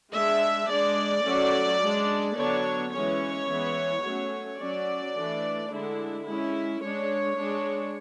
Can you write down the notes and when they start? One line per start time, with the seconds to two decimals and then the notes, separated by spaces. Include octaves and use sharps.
0.13 G#3 D4 E5
0.69 G#3 D4 D5
1.25 F#3 A3 C#4
1.81 G#3 D4
2.36 D3 F#3 B3 D4 C#5
2.92 E3 G#3 C#4 C#5
3.48 E3 G#3 B3
4.04 F#3 A3 C#4
4.59 F#3 C#4 D5
5.15 E3 A3 D4
5.71 D3 G#3 D4 E4
6.26 G#3 C#4 E4
6.82 G#3 D4 C#5
7.38 G#3 D4